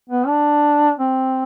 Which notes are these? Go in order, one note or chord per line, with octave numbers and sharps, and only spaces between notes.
B3
D4
C4